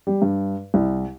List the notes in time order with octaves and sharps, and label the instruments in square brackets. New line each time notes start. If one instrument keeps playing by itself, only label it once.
[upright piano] G3
G2
C2